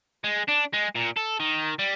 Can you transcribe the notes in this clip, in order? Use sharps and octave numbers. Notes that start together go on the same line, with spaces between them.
G#3
D4
G#3
A#2
A4
D#3
G3